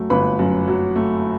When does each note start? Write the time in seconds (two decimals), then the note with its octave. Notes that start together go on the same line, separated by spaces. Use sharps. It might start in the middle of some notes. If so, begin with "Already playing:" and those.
Already playing: F#2 F#3 A3
0.10 G1 B4 B5
0.39 F#2
0.68 F#3
0.96 A3